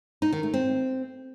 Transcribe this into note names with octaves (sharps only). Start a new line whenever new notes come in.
D#4
D#3
A3
C4